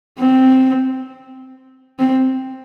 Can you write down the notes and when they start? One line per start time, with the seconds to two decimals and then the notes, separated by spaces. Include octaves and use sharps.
0.19 C4
1.99 C4